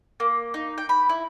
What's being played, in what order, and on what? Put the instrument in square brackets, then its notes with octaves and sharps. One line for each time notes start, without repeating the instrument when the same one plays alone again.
[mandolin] A#3
D#4
G5
B5
E4